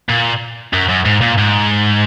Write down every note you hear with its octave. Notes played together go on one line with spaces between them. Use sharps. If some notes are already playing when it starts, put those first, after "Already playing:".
A#2
F#2
F#2
G#2
A#2
G#2